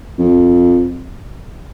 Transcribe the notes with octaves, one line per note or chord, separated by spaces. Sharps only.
F2